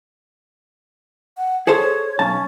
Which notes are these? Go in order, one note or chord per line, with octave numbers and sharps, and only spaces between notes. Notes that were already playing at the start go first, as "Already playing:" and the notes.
F#5
G#4 A4 C5 C#5
B1 C#4 A5